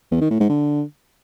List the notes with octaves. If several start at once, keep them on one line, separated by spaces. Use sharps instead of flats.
E2
D#3
A2
G#2
D3